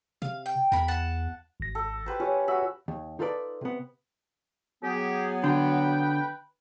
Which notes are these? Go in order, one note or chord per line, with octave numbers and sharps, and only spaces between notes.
C3 F5
G5
E2 A#4 B5
F#5 A5
G#1 A#6
A4
G4 B4 C5
C#4 F4 G4 C#5
F#4 E5 B5
D#2
D#4 F4 A4 B4 D5
C3 B3
F#3 B3 G4 G#4
D3 B4 G5